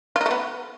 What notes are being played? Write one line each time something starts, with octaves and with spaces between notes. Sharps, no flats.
F4
D#4
A3
B3